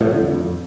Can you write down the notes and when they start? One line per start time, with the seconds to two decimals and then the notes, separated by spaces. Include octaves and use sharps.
0.01 A2
0.07 F3
0.14 D3
0.21 F2